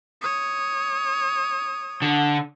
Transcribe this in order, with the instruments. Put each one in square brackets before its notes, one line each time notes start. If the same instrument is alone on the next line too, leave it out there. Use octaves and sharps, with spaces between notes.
[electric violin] C#5 D#6
[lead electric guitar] D3